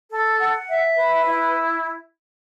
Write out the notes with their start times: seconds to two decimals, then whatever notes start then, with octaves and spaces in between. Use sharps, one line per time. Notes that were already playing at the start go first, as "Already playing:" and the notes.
0.10 A4
0.39 F#5
0.68 E5
0.97 B4
1.25 E4